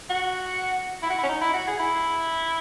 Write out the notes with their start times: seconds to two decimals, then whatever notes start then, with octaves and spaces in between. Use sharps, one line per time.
0.10 F#4
1.03 E4
1.10 F#4
1.18 E4
1.23 C#4
1.29 D#4
1.41 E4
1.54 F#4
1.67 G#4
1.79 E4